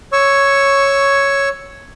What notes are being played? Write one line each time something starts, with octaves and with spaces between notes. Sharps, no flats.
C#5 C#6 E6